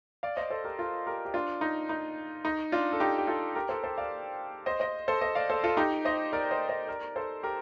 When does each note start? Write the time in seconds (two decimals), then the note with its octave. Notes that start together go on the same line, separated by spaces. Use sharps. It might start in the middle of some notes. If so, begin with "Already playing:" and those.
0.23 D5 F5
0.37 C5 D#5
0.50 A4 C5
0.64 G4 A#4
0.79 F4 A4
1.06 G4 A#4
1.25 G4
1.34 D4 F4
1.61 D#4
1.89 D#4
2.45 D#4
2.72 D4 F4
2.93 A4
3.00 D#4 G4
3.18 G4
3.27 F4 A4
3.55 G4 A#4
3.69 A4 C5
3.84 A4 C5
3.98 D5 F5
4.66 C5 D#5
4.80 C5 D#5
5.08 A4 C5
5.21 C5 D#5
5.35 D5 F5
5.50 A4 C5
5.63 F4 A4
5.77 D#4 G4
6.05 C5 D#5
6.33 A#4 D5
6.51 C5 D#5
6.69 C5 D#5
6.88 A#4 D5
7.16 A4 C5
7.43 G4 A#4